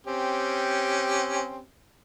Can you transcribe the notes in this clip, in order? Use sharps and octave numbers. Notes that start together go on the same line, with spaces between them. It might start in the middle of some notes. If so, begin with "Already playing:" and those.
C4 C#4 G4